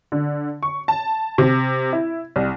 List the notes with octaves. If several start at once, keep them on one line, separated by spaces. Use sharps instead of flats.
D3
C#6
A5
C3
E4
C2